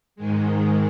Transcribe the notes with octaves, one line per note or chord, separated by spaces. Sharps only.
G#2 D#3 G#3